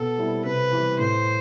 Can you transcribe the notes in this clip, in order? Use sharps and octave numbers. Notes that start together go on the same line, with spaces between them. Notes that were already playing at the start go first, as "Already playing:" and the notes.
Already playing: B2 A4
G3 C4 E4
C3 B4
E3 G3
A2 C5